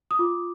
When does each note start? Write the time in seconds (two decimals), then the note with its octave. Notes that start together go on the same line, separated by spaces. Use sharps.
0.11 D#6
0.19 F4 D6